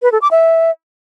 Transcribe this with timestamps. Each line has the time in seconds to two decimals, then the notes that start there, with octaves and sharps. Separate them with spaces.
0.02 B4
0.12 A4
0.22 D6
0.31 E5